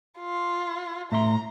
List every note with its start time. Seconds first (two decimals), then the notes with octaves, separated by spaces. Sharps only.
0.19 F4
1.12 A2 E5 A#5 C6